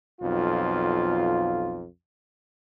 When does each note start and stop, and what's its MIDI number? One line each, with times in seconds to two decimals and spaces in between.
0.21 1.86 35
0.21 1.86 41
0.21 1.86 65